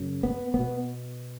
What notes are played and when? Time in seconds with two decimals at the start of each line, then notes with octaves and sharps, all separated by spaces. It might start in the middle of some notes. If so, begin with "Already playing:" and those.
Already playing: F#2 C#3
0.23 B3
0.54 B2 B3